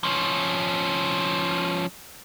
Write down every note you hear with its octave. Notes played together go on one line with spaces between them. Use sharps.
F3 C#4